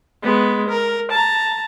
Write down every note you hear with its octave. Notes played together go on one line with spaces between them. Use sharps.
G#3 B3
A#4
A5 A#5